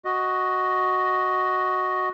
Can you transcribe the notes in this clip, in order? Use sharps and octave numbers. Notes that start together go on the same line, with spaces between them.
F#4 D#5